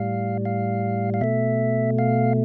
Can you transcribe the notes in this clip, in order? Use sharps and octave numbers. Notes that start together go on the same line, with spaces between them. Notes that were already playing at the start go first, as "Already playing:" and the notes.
Already playing: A2 G3 F5
F5
F5
B2 A3 E5
F5